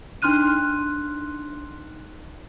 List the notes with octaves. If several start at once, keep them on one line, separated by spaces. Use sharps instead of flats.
D4 D#4 C6 F6 F#6 D#7